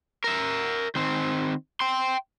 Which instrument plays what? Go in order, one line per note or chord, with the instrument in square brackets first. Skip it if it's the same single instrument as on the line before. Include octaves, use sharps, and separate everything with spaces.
[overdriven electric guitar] A#4 E5
D#3 C4
G5 C6